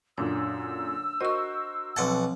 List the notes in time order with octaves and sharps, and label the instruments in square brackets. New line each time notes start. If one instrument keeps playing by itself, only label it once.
[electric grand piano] F#2 A#2 D3 [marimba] D4 [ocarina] E6
[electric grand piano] F#4 A#4 C5 [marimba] D#5 C#6
[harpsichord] B1 F#5 A5 [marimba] F3 C4